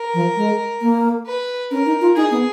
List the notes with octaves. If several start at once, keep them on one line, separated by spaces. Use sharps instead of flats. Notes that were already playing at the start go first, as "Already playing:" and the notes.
Already playing: A#4
F3
G#3
A#3
B4
C#4 A#4
D#4
F4
D#4 G#4
B3